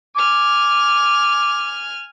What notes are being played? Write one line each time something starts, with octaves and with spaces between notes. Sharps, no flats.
G#5 D6 F6